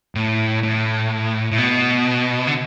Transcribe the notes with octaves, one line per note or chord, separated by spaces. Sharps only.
A2
A2
A2
B2
D3